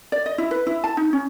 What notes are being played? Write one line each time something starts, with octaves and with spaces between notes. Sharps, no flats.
D5
D#5
E4
B4
E4
A5
D#4
C#4